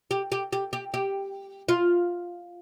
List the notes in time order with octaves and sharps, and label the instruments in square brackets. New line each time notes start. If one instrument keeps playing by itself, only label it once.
[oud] G4
G4
G4
G4
G4
F4